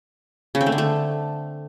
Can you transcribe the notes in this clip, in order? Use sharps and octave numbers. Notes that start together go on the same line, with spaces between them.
C#3
C4
A3
D3
A3